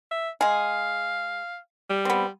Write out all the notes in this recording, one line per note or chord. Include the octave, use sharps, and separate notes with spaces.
E5
G#3 G#4 F5
G3
B3 C4